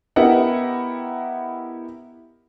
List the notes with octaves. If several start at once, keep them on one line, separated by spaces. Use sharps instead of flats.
B3 E4 G4 A#4 D#5 F#5